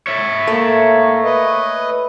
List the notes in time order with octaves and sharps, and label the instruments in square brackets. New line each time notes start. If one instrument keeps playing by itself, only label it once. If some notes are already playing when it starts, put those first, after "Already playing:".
[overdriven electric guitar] C#5 E5
[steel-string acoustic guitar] A3 [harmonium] A#3
[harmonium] B4 D#5